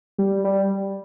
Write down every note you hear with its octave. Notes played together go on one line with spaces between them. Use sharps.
G3
G3